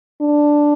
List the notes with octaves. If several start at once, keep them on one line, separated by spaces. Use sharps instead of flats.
D4